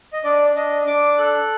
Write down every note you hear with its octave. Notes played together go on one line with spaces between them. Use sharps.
D#5
D4 D5
D4 D#5
D4 D6
A4 F#6